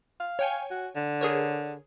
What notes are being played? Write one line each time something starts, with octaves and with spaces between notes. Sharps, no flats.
F5
C#5 G5 G#5
F#4
D3
G#4 A#4 C#5